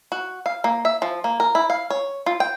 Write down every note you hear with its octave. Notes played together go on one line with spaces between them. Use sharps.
F#4
F5
A#3
E5
F3
A#3
A#4
E4
F5
C#5
F4
G5